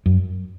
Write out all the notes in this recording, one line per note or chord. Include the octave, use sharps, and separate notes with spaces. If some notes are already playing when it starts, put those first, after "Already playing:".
F#2